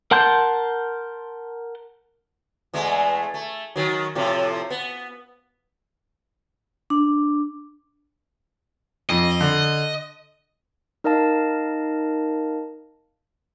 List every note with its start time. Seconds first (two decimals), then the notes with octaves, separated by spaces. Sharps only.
0.11 A#4 F#5 A5 C6 G6
2.74 E2 G#3 A3
3.34 A3
3.76 D#3 F#3
4.15 A2 C3 F3
4.70 B3
6.90 D4
9.09 F2 D#5
9.41 D3
11.04 D#4 A#4 D#5 F5 A5